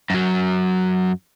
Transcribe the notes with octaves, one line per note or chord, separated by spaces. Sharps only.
F#2 F#3